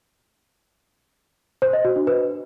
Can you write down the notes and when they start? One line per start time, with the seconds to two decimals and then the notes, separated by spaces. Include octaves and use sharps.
1.62 C5
1.73 D#5
1.85 F#4
1.96 D4
2.07 B4